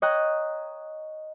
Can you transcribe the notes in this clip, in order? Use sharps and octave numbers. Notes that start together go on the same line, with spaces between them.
C#5 D#5 G5 A#5 F#6